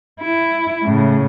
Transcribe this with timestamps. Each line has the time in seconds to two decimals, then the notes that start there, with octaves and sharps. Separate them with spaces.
0.21 E4
0.84 A2 C#3